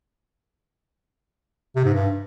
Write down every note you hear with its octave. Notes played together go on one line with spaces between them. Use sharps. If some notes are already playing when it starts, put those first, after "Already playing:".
C3
G#2
G2